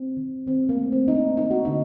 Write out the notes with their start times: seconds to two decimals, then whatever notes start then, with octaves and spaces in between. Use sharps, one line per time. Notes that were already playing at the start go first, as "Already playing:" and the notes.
Already playing: C4
0.17 D#3
0.46 D#3 C4
0.69 A#3
0.77 A3
0.92 C4
1.07 D#3 D#4
1.15 D4
1.37 A#3 D#4
1.51 F#4
1.65 D3 D#4